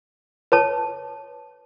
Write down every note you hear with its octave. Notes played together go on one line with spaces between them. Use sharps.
B4 C#5 A5